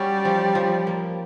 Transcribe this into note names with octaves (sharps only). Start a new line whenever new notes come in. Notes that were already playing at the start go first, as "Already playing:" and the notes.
Already playing: G3 C#4 F#4
F3
F3
A#3